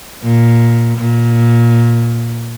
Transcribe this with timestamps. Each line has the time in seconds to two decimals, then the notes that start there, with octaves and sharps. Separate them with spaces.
0.23 A#2
0.97 A#2